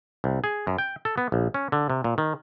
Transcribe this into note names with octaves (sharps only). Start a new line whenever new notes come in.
C2
G#4
F#2
G5
A4
B3
A#1
C#4
D3
C3
A#2
D#3